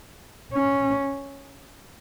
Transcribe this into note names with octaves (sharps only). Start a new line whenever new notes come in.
C#4